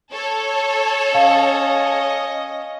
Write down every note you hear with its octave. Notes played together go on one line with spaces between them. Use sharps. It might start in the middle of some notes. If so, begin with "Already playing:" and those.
A4 C#5
C#4 D#5 F5